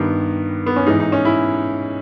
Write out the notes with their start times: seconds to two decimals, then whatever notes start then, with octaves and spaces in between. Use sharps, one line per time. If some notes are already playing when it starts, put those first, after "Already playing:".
Already playing: G2 D#3 B3
0.66 B3
0.76 C#4
0.86 G#2 E3 D#4
1.00 D#4
1.12 C#4
1.25 E4